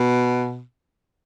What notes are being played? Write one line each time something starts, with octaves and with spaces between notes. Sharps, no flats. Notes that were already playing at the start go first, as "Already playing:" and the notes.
Already playing: B2